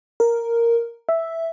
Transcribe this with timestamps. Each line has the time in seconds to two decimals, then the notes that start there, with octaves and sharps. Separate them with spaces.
0.20 A#4
1.09 E5